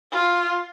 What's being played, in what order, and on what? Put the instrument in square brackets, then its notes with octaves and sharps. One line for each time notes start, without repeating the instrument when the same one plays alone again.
[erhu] F4